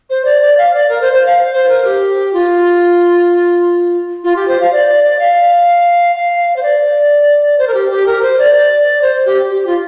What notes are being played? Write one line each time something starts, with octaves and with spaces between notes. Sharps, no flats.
C5
D5
D5
F5
D5
A#4
C5
C5
F5
C5
A#4
G4
F4
F4
G4
C5
F5
D5
D5
D5
F5
F5
C5
D5
C5
A#4
G4
G4
A#4
C5
D5
D5
C5
G4
G4
F4